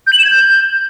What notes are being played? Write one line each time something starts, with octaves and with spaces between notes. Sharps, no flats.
G6
F#7
E7
G#6
G6